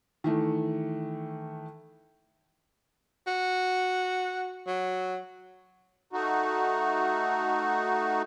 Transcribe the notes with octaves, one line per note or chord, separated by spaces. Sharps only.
D#3 E3 A3
F#4
F#3
A3 D#4 F#4